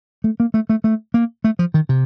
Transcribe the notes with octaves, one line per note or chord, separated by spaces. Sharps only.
A3
A#3
A3
A3
A3
A#3
A3
F3
D#3
C3